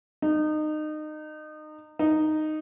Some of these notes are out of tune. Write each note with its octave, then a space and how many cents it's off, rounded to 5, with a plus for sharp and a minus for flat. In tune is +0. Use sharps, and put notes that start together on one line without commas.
D#4 -25
D#4 -10